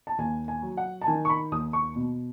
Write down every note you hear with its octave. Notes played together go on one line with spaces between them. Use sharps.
A5
D#2 G#5
G#5
F#3
F#5
A5
D#3 G#5
C#6
B5
D#2 D#6
C#6
B2